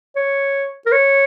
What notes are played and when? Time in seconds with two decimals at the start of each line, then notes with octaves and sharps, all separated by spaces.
0.16 C#5
0.86 A#4
0.92 C#5